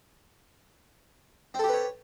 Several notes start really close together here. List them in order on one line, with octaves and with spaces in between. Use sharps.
C4 A4 G4 B4 C#5